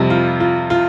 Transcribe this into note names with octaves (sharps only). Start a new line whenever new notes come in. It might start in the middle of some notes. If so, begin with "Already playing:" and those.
Already playing: F2 C3 G3
F4
F4
F4